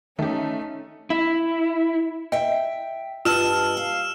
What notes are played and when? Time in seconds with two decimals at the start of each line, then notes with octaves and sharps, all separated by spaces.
0.19 D#3 A3 C#4 D#4 G4
1.10 E4
2.32 D#5 E5 G5
3.25 G2 F4 D#5 A5 E6 F6 E7
3.77 F5